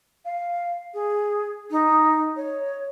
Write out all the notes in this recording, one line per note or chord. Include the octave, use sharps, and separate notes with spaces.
F5
G#4
D#4
C#5